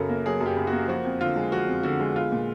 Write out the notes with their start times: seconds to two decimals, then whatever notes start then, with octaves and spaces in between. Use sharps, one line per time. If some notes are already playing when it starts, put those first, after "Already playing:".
Already playing: F#2 C#3 F#3 A4 A#4
0.09 A#3
0.25 F#3 G#4
0.41 F#2
0.46 G4
0.56 C#3
0.67 F#4
0.72 A#3
0.88 F3 F#4
1.05 F2
1.21 D3 F4
1.36 G#3
1.52 F3 F#4
1.67 F2
1.83 D3 F#4
2.00 G#3
2.16 B3 F4
2.32 A#2